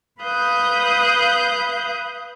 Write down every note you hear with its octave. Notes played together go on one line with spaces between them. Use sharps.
B4 F5 D#6 F#6 G6